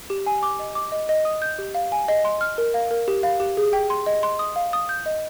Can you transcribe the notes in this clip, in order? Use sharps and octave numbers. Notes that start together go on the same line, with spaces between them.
G4
G#5
D6
D#5
D6
D#5
D#5
D#6
G6
G4
F5
G#5
D#5
C6
F6
A#4
F5
A#4
G4
F5
G4
G#4
G5
C6
D#5
C6
D#6
F5
D#6
G6
D#5